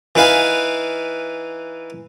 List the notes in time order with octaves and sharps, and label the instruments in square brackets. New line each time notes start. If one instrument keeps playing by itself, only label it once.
[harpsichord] E3 D#4 B4 F5 G#5